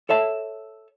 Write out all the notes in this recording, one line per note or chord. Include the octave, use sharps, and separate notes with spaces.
A4 C#5 E5 A5